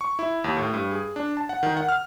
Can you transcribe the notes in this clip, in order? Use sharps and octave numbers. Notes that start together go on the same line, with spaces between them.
C#6
E4
D#2
A2
G2
G#4
D4
A5
F#5
D#3
F#5
F6